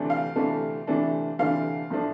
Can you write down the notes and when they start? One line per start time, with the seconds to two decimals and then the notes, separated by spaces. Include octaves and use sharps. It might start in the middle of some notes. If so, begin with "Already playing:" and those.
Already playing: D2 C3 E3 A3 D4
0.10 F5
0.36 D2 C3 E3 A3 D4
0.87 D2 C3 E3 A3 D4
1.39 D2 C3 E3 A3 D4 F5
1.90 A2 F3 A3 D4